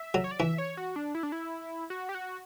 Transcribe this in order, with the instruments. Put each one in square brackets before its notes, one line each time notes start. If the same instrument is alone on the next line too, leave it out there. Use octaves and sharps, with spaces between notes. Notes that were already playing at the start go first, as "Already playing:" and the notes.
Already playing: [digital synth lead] E5
[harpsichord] F#3
[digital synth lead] C#5
D5
[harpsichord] E3 [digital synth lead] E5
[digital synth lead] C#5
F#4
D4
E4
D4
E4
F#4
G4
F#4